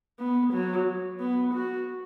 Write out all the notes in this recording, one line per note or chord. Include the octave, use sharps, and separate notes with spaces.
B3
F#3
B3
F#4